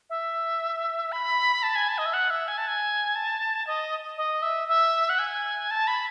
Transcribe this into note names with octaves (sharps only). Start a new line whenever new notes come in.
E5
B5
A5
G#5
A5
D#5
E5
F#5
E5
G#5
A5
G#5
A5
D#5
D#5
E5
E5
F#5
G#5
A5
B5